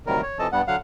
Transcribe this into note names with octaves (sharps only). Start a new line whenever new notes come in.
D2 C3 D#3 F#3 G3 A#4
C#5
C3 E3 F3 A4 D#5 A5
G2 G3 B3 F#5
D3 F#3 F5 F#5